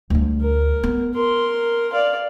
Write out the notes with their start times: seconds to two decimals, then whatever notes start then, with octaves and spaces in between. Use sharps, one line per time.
0.10 D2 G3
0.41 A#4
0.83 B3
1.13 A#4 C6
1.93 D5 F5